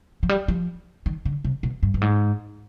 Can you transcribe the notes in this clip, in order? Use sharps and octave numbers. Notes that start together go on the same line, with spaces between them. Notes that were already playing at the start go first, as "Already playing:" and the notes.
F3
G3
F3
D#3
D3
C3
B2
G2
G2
G#2